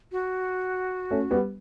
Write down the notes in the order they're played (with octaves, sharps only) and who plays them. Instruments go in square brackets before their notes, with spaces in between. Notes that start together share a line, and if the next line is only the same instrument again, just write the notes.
[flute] F#4
[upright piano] A3 C#4
G3 B3